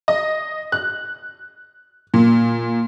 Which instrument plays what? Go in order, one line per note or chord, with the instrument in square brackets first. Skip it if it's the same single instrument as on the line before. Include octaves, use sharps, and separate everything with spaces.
[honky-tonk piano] D#5
F#6
A#2